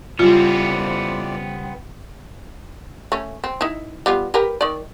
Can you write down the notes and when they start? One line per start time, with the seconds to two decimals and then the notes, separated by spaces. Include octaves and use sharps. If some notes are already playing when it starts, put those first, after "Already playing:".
0.19 F2 C#3 E3 G3 B3 C4 F4 D5
3.12 A3 C#4
3.44 C4
3.61 D#4 E4
4.06 G3 B3 F4
4.34 G4 A#4 B4
4.61 D#3 D5